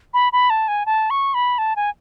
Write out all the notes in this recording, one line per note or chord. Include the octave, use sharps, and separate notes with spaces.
B5
B5
A5
G#5
A5
C#6
B5
A5
G#5